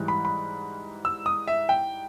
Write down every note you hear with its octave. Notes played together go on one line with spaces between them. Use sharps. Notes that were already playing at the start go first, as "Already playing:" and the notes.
Already playing: G#2 E3 G3
B5
B5
E6
D#6
E5
G5